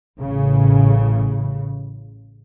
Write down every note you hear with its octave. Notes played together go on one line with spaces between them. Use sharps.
A1 A2 C#3